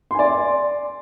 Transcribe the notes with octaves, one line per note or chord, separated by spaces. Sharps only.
D5 G#5 C6